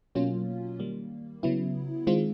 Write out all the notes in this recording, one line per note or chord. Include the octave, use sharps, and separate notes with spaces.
B2 F#3 A#3 C#4 F4
D#3 G3 A#3
C#3 F#3 B3 E4
D#3 G#3 C4 F4